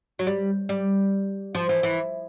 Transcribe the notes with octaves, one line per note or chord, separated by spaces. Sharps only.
F#3
G3
G3
F3
E3
E3